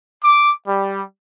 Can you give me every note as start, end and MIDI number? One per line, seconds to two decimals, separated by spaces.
0.24 0.51 86
0.67 1.02 55